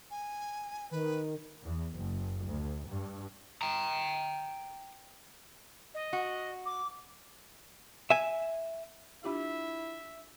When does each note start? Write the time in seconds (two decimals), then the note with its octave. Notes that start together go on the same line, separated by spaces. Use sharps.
0.11 G#5
0.91 D#3 B4
1.62 E2
1.94 F#1
2.46 D2
2.87 G2
3.62 G5 A#5
5.94 D#5
6.13 F#4
6.66 D6
8.10 E5 G#5
9.24 D4 E4 F4 G4 E5